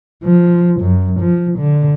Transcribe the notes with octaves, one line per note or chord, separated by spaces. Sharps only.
F3
F#2
F3
D3